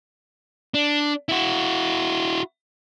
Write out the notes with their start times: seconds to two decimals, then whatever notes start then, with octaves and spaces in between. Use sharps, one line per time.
0.74 D4
1.29 E4 F#4